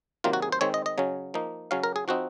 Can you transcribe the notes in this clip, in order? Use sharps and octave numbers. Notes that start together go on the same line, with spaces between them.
C3 D#3 F#3 A#3 F4
F#4
G#4
C5
D#3 G#3 C4 C#5
D#5
D#5
C#3 F#3 C#4
F3 A#3 D#4
C#3 F#3 C#4 F5
A#4
G#4
F3 C4 D#4 F#4